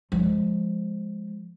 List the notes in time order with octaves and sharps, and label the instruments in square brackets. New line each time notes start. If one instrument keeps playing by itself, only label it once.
[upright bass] F3 G#3